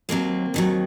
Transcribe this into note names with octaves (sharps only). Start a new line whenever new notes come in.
D#2 D#3 F#3 A#3 C4
D#2 D#3 F#3